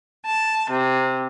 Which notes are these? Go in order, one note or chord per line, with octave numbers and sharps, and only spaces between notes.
A5
C3